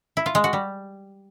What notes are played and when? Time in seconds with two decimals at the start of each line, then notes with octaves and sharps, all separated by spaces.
0.17 E4
0.26 F4
0.35 G#3
0.44 F#4
0.53 G3